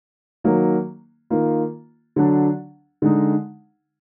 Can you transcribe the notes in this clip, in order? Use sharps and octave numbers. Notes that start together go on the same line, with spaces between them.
D#3 F#3 A#3
D#3 A#3 F4
D3 F#3 D4
D3 G#3 D#4